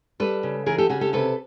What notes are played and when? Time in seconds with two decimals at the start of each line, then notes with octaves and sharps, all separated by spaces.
0.20 G3 A4 B4
0.43 C#3
0.66 E3 G#4 A#4
0.78 G4 A4
0.89 C#3 F#4 G#4
1.01 G4 A4
1.13 C3 A4 B4